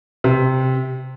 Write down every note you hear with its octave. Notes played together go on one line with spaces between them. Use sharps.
C3